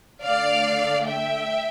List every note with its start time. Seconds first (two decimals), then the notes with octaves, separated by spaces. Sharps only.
0.23 D3 A3 D5 F5
1.06 E5 G5